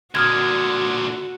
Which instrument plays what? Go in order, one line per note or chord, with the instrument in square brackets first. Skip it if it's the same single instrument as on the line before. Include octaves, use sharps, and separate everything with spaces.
[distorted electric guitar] A#2 D3 [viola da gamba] F#4 [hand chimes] D#6 F6 G#6